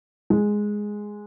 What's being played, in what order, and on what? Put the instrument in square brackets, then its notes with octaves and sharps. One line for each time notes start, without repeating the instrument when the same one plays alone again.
[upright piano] G#3